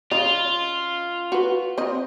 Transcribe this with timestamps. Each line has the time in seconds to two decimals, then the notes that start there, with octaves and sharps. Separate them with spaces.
0.11 C#3 F4 D#5
1.32 F#4 B4
1.78 C4 D#5